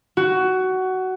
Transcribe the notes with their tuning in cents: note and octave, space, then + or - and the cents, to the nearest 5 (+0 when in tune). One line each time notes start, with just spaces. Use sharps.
F#4 +15